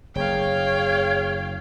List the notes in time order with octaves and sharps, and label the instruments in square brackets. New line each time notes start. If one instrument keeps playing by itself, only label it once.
[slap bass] F#1 [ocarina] G#4 [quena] C#5 [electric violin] F5 G5